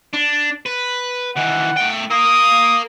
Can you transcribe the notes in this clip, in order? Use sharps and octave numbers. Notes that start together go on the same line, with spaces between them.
D4
B4
D#3 E3 F#5
A3 G5
A#4 F5 D#6